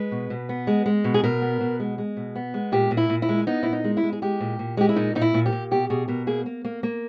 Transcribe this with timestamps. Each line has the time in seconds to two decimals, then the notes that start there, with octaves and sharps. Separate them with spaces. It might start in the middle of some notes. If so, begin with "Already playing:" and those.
Already playing: G#3 B4
0.12 B2
0.30 B2
0.49 B3
0.67 G#3
0.86 G#3
1.04 B2
1.14 G#4
1.24 B2 A#4
1.42 B3
1.61 B2
1.80 G#3
1.98 G#3
2.17 B2
2.35 B3
2.54 G#3
2.72 A#2 G4
2.91 A#2
2.97 E4
3.10 A#2
3.22 E4
3.29 G#3
3.47 B3 D#4
3.63 A#2 E4
3.73 D#4
3.84 G#3
3.97 E4
4.03 G#3
4.13 G#4
4.22 G#3 G4
4.40 A#2
4.59 A#2
4.77 G#3 G4
4.89 E4
4.96 A#2 D#4
5.15 A#2 D#4
5.22 E4
5.34 A#2
5.46 G4
5.52 A#2
5.71 B2 G4
5.90 B2 G#4
6.08 B2 A#4
6.27 A#3 G#4
6.46 A#3
6.65 A#3
6.83 A#3